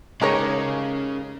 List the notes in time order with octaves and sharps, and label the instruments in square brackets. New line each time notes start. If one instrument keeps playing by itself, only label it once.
[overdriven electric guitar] C#3 [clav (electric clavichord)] G#3 D#4 [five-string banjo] G4 A#4 C#5